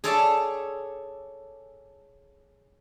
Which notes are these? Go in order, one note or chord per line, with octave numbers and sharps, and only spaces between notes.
G#4 A4 C#5 D5 E5 A5